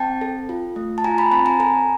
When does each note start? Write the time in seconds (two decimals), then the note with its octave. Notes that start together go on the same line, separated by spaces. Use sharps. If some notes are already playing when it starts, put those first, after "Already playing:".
Already playing: C4 G5 A5
0.21 A4
0.49 F4
0.76 A3
0.98 A5
1.04 F4 G#5 A#5
1.18 A5 B5
1.31 C4 A5 B5
1.46 G#5 A#5
1.60 A4 G#5 A#5